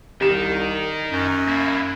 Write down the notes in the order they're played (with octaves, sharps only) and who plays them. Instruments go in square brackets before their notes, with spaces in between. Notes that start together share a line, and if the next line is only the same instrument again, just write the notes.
[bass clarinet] C2 [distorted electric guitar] D#3 D#4 [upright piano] G4 E7
[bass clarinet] F#2
[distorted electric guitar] A#3 E4